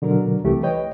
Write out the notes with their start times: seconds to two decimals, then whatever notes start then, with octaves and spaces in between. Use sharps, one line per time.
0.02 B2 D3 F#3 A#4
0.44 C2 E3 A3 G4
0.63 B4 C#5 D#5 G5